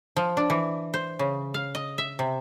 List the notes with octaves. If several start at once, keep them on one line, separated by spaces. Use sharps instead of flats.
F3
D4
E3
C5
C#3
F5
D#5
E5
C3